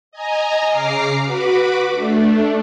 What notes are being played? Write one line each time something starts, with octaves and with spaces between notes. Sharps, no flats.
D#5 G#5 A#5
C#3 A#5 D6 F6 C7
F#4 B4 B5 D6
A3 D4